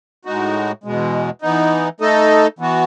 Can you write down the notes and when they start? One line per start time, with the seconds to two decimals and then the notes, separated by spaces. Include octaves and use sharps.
0.25 A2 G#3 D#4 F#4
0.84 E2 B2 G#3
1.42 E3 B3 D#4
2.00 A3 D#4 A4 D#5
2.59 E3 B3 F#4